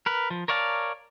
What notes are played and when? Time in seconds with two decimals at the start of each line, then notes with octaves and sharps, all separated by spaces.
0.06 A#4 B4
0.30 F3
0.48 A#4 C#5 D5 F5 A5